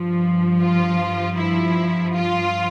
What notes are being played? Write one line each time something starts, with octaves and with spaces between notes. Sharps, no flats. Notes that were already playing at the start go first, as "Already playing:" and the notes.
Already playing: G2 F3
F4
E4
F4